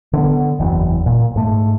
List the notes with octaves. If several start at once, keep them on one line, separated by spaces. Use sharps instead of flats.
D3 B3
F#1 E2
A#2
G#2 A3